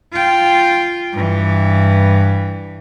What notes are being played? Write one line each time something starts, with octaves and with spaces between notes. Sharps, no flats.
F4 G5
G2 E3